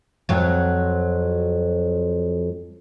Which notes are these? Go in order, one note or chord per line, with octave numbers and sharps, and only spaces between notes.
F2 F#3